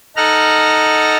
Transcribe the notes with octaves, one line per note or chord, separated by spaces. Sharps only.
D#4 A4 F#5 A#5 F6